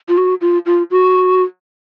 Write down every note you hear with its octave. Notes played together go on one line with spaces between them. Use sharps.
F4
F#4
F4
F4
F#4